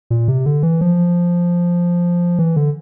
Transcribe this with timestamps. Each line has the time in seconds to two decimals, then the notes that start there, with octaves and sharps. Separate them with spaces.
0.10 A#2
0.28 C3
0.46 D3
0.63 E3
0.81 F3
2.39 E3
2.56 D3